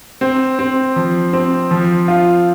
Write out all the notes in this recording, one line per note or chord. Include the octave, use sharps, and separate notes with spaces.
C4
C4
F3
C4
F3
F4